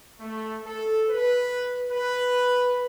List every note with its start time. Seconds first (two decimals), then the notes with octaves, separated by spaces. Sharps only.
0.20 A3
0.66 A4
1.09 B4
1.92 B4